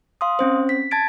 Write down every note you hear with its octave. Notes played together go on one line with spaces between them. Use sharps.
F5 C6 D#6
C4 C#4 C5
B6
A5 G#6 A6 D7